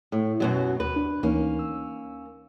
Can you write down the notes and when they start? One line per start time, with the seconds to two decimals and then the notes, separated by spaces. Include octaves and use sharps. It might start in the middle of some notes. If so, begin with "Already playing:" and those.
0.12 A2
0.40 F#2 B2 F#3
0.80 D#2 B4
0.96 D4
1.23 D2 E3 A#3 C#4 D#4
1.59 E6